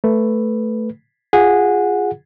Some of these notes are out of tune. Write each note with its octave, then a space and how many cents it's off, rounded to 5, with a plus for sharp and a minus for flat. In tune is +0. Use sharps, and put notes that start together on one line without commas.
A3 +0 B4 +0
F4 +5 G#4 -10 F#5 -15